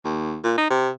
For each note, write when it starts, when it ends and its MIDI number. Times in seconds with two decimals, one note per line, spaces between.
0.05 0.39 39
0.44 0.53 46
0.58 0.67 63
0.71 0.90 48